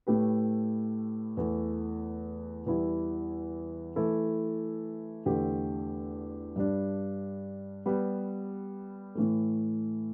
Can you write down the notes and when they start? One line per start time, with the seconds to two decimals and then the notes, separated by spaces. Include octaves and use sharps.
0.07 A2 A3 G4 B4
1.37 E2 E3 A3
2.66 E2 E3 G3 E4
3.96 E3 A3 E4 A4
5.26 E2 D3 A3 G4
6.56 G2 G3 D4
7.86 G3 B3 G4 B4
9.15 A2 E3 A3